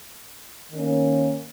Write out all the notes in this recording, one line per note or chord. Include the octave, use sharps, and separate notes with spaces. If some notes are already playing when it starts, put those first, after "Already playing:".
D#3 A#3 C#4